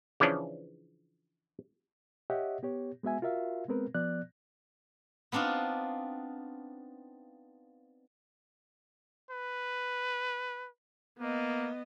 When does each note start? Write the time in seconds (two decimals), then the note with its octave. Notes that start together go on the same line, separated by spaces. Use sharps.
0.20 C#3 E3 F3 C#4 D4
2.30 G4 C#5 D#5 E5 F#5
2.63 B3 G4 C#5
3.03 G#3 B3 F#4 E5 G#5
3.22 F4 F#4 A#4 E5 F5
3.68 G#3 B3 C4 A#4 B4
3.95 F3 B3 D5 F#6
5.32 B3 C4 D4 D#4 F4
9.31 B4
11.19 A#3 B3 D#5